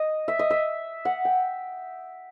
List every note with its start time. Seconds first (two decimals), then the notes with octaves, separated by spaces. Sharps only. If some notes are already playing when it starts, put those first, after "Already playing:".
Already playing: D#5
0.28 E5
0.39 D#5
0.50 E5
1.05 F#5
1.25 G5